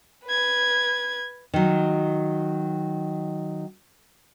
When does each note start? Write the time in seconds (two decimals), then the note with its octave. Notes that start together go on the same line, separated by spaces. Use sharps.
0.25 B4 G#6
1.54 D#3 F#3